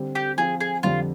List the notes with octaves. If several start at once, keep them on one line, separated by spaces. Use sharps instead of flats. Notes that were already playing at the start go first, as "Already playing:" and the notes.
Already playing: D3 G3 C4
G4
F3 C4 F4 G#4
G#4
F2 D3 G3 F4